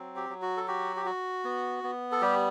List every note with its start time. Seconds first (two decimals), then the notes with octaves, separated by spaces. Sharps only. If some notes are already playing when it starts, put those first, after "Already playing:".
Already playing: F#3 C4
0.16 G4
0.29 F#3
0.42 F#4
0.57 A4
0.68 F#4 G4
0.96 G4
1.06 F#4
1.44 B3
1.84 B3
2.12 A4
2.21 G3 G4